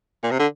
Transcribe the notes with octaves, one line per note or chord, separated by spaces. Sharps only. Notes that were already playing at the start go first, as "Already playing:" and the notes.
A#2
C3
D3